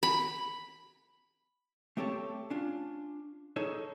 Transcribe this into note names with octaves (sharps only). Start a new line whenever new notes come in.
B5
A3 C4 G4 A4 C#5 A5
C#4 D4 F4
D#4 G#4 A4 C#5